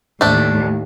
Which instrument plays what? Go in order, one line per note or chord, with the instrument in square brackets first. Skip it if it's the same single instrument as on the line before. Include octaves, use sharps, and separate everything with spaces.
[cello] D#2 A2 [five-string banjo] A3 D4